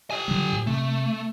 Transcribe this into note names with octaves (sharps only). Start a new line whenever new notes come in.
G4 G#5
D3 F#3 G3
A2
C3 A3